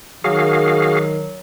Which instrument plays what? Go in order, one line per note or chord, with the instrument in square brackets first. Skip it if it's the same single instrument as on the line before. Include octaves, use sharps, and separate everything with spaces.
[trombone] D#3 [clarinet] F#3 [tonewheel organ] F#4 G#4 F5